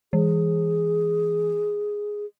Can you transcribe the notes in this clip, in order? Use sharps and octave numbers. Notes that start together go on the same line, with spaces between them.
E3 G#4